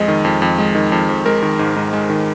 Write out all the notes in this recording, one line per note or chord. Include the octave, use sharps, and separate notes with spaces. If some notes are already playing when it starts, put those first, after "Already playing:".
Already playing: F2 G#3 D#5
D#3
F2
F2
G#3
D#3
F2
F2
G#3 A#4
D#3
G#2
G#2
G#3
D#3